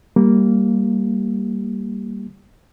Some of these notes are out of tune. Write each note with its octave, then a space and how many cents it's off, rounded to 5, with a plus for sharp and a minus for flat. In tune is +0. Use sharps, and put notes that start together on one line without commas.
G3 +0 A#3 -5 G4 +0